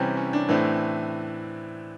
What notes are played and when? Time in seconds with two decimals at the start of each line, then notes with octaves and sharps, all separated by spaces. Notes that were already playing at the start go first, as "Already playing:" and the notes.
Already playing: C3 E3 G3 C4 C#4
0.17 C#4
0.33 D4
0.48 A2 E3 A3 C4 D4